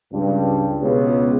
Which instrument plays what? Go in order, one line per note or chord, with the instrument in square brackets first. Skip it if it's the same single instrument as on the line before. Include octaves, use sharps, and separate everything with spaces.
[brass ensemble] C#2 G2
C#2 B2 G#3 B3 C#5